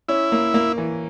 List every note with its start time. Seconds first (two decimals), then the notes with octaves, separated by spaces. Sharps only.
0.08 C#4 E4
0.32 A#3
0.54 A#3
0.78 E3